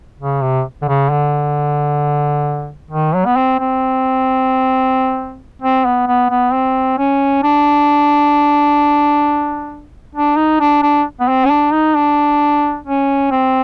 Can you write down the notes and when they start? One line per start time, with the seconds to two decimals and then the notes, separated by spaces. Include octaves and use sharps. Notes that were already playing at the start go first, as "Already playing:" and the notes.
0.20 C#3
0.42 C3
0.82 D3
0.88 C#3
1.10 D3
2.91 D#3
3.14 F#3
3.26 B3
3.37 C4
3.60 C4
5.62 C4
5.86 B3
6.07 B3
6.30 B3
6.53 C4
6.98 C#4
7.43 D4
10.15 D4
10.37 D#4
10.60 D4
10.82 D4
11.20 B3
11.28 C4
11.45 C#4
11.50 D4
11.73 D#4
11.96 D4
12.86 C#4
13.31 C4